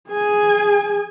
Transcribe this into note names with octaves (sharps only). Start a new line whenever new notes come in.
G#4 G#5